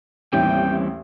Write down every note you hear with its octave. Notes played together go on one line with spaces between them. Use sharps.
A1 D#2 E3 G3 C4 G5